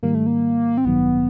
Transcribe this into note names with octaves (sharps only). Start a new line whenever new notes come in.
G#2 D#3 G3 A#3
A3
A#3
C4
A1 G2 D#3 F#3 B3